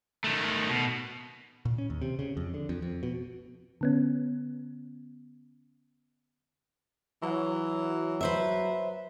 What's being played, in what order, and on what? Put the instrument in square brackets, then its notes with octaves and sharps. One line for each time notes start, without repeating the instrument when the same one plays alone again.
[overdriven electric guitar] D#3 A3
B2
[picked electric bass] A#2
C#4
D#2
C3
C#3
F2
D3
F2
F2
B2
[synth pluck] D3 B3 C#4
[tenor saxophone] E3 [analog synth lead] F#3
[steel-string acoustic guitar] B4 C5 E5